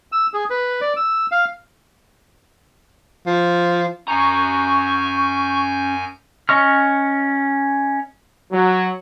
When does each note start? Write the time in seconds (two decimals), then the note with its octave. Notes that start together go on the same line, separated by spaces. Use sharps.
0.12 E6
0.34 G#4
0.50 B4
0.81 D5
0.97 E6
1.32 F5
3.27 F3
4.08 F#2 C#4 G#5 A#5 C#6 G6
6.49 C#4 D#5 C#6 F6
8.52 F#3